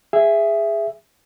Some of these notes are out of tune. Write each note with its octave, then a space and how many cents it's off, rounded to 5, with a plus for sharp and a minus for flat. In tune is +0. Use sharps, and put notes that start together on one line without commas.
G#4 -10 E5 +10